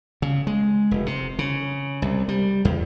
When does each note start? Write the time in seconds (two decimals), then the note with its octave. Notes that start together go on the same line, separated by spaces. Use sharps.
0.22 C#3
0.47 G#3
0.91 F1
1.06 C3
1.39 C#3
2.02 C2
2.29 G3
2.65 E2